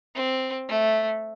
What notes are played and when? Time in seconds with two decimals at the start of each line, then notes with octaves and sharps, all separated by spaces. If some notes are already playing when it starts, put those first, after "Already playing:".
0.15 C4
0.68 A3